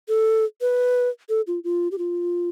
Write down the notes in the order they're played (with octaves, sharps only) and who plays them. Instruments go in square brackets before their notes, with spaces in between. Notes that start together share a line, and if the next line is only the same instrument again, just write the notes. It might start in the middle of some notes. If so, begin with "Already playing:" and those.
[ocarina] A4
B4
A4
F4
F4
G4
F4